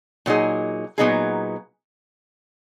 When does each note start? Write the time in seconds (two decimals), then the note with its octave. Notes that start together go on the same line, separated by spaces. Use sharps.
0.26 A#2 F#3 B3 D#4 G#4
0.98 A#2 F#3 B3 D#4 G#4